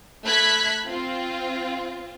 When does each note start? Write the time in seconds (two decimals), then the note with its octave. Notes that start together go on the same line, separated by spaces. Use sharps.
0.24 A3 B5 F#6 G#6 B6
0.87 C4 F4